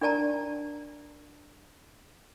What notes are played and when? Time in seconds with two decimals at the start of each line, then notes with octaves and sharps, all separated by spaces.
0.01 D4 A#4 D5 A5 A#5